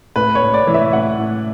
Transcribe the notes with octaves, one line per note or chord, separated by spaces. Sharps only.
A2 B4
C#5
A2
D5
E3
E5
A2 F#5
A2